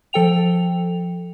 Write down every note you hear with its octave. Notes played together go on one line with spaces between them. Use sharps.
F3 A4 G5 F7